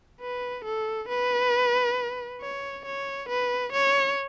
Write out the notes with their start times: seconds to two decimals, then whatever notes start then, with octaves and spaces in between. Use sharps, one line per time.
0.21 B4
0.65 A4
1.09 B4
2.41 C#5
2.86 C#5
3.29 B4
3.73 C#5